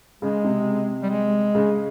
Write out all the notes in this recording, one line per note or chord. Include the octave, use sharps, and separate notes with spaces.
C#3 G#3
C3
G3
G#3
C#3